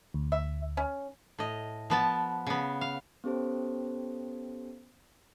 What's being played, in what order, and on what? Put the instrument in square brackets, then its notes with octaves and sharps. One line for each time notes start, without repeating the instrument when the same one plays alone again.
[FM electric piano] D2
[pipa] E5
C#4
[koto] A2 D#5
F3 B3 A5
C#3 B3
F5
[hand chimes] B3 C#4 G4 A4 C5